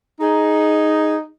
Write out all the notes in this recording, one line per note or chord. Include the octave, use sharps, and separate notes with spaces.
D#4 G#4